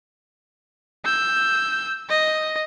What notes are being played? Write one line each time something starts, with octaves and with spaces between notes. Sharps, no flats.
E6 G6
D#5